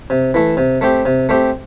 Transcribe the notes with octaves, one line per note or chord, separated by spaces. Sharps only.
C3
E3 A3
C3
A3 C4 G4
C3
A3 C4 G4